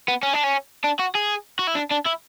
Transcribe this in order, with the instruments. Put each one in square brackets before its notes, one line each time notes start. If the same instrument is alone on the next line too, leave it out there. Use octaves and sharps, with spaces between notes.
[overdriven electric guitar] B3
C#4
D4
C#4
D4
F#4
G#4
F#4
E4
D4
D4
E4